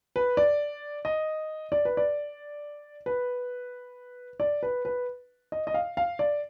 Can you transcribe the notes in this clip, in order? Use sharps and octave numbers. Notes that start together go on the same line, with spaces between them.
B4
D5
D#5
D5
B4
D5
B4
D5
B4
B4
D#5
D#5
F5
F5
D5